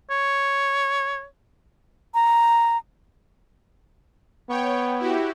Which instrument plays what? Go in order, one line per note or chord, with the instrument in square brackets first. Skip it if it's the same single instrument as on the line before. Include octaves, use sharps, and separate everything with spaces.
[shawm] C#5
[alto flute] A#5
[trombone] B3 [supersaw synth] C#5 G5
[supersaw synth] E4 F#4 G4